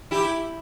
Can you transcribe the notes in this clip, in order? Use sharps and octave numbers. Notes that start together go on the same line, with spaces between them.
E4 G4